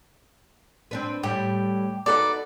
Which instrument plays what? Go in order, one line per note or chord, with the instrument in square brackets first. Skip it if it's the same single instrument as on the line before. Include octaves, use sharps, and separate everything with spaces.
[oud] C4 D4 B4
[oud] A2 G3 [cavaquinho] G4
[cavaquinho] D#4 B4 D5 [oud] F#4 A4